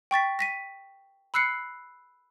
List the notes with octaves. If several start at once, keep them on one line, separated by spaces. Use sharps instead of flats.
G5 C#6 A6 B6
A#6 B6 D#7
B5 E6 F#6 C7 C#7